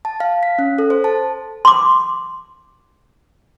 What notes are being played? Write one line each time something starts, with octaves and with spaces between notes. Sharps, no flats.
A5
F5
B6
C#4
A4
C5
A5
C6 D6